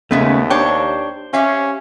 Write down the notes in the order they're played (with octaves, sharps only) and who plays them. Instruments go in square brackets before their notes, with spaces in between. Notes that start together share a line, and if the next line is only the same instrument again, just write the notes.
[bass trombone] D#2 [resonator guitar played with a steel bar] C#3 G#3 C#4 [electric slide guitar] A3 B3 E5
[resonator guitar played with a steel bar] D4 G4 C#5 [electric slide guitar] C5 G5
[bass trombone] C#4 [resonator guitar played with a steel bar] G4 E5 F5